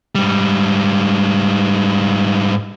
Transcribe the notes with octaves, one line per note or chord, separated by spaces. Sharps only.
G#2 G3